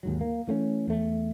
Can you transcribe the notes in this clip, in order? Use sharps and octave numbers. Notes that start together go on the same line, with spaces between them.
D#2 G#2 F#3
A#3
E3 A3 A#3 C#4
E2 A3